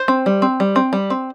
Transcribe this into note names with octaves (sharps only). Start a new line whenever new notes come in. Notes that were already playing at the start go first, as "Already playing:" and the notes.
Already playing: C5
C4
G3
C4
G3
C4
G3
C4